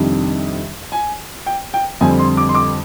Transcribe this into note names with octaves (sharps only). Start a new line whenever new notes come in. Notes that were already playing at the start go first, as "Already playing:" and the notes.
Already playing: F2 C3 D#3 G3 D4
G#5
G5
G5
F2 D3 G3 C4 G#5
C6
D6
C6
D6